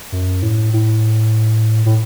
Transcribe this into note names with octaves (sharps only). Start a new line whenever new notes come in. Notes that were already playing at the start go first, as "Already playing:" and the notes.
F#2
A2
A2
A2